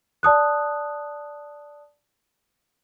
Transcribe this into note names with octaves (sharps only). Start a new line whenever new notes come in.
D5 A5 D#6 F#6